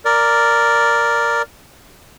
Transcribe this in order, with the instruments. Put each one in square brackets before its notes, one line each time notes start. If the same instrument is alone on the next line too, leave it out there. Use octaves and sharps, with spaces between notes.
[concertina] A#4 D5